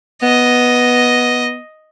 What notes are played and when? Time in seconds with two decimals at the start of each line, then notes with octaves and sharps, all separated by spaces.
0.22 B3 D#5